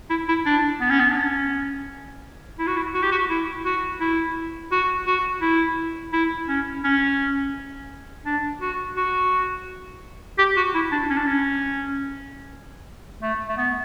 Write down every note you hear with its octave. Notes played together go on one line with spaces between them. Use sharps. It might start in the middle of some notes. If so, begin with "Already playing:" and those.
E4
E4
D4
B3
C#4
B3
D4
C#4
E4
F#4
E4
F#4
G4
F#4
E4
F#4
E4
F#4
F#4
E4
E4
C#4
C#4
D4
F#4
F#4
G4
F#4
E4
D4
C#4
D4
C#4
A3
A3
B3